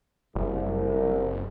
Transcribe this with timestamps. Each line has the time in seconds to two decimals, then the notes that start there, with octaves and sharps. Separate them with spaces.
0.35 F#1 C2